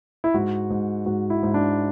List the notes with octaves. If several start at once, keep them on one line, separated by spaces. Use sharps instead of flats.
E4
G#2 F#4
G#2
G#2 F#4
E4
G#2
D4